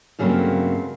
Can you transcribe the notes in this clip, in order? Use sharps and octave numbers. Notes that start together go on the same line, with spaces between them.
G2 C#3 F#3 A3 A#3 C4